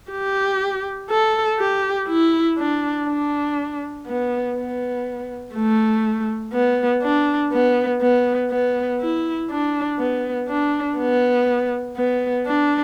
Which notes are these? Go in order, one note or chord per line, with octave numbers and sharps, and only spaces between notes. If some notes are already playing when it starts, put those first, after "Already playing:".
G4
A4
G4
E4
D4
D4
B3
B3
A3
B3
D4
B3
B3
B3
E4
D4
B3
D4
B3
B3
D4